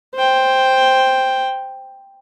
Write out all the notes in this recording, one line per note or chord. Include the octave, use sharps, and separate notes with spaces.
C5 G5